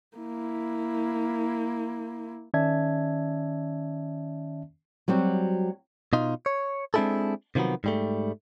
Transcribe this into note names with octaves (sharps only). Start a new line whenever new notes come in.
A#3 E4
D#3 C#4 D5 E5 A5 G#6
F#3 G3 C4 F#4
B2 D#4 F4
C#5
G#3 C4 D4 E4 G#4 A4
C3 D#3 F3 F#3 B3
G#2 G3 A3